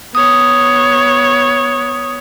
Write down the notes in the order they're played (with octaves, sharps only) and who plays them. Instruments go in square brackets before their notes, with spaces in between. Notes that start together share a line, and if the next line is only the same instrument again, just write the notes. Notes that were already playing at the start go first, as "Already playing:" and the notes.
[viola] B3 C#5 [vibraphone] D#6